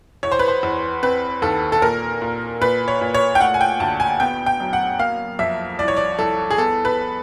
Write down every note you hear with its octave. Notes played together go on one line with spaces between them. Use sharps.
E2 C#5
C5
B4
C5
E2
C4 B4
D#2 A4
A4
A#2 A#4
A#2
A#2 B4
C#5
A#2
C#5
G5
A3 F#5
G#5
G5
D2 A5
G#5
B3 G5
G5
F#2
F#5
A#3 F5
F2 E5
C2 D5
C#5
D5
C2 A4
G#4
B3 A4
B4